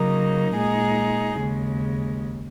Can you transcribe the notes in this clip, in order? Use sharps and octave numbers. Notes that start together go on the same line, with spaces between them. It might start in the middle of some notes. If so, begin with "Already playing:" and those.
Already playing: C#3 F#3 A#3 D#4
A#2 G#3 D#4 G#4
D#2 C#3 G#3